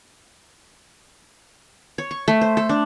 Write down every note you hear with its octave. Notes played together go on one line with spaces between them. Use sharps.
C#5
C#6
A3
C5
A4
D4